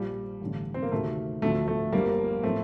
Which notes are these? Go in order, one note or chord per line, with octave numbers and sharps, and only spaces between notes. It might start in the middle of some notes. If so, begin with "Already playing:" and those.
Already playing: A#1 A#2 F3 G3
A1 G2 D3
C4
A#3
D2 C3 D#3 A3
D2 D3 F3 A3
A3
G1 F2 D3 F3 G3 A#3
A2 F3 A3 C4